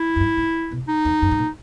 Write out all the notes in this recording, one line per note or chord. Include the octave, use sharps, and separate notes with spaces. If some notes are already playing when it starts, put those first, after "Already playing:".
Already playing: E4
F#2
G#2
G#2
B2
D#4
E2
F#2
G#2
A#2